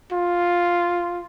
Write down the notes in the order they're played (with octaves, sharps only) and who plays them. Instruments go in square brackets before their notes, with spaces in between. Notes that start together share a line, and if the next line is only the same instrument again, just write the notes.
[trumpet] F4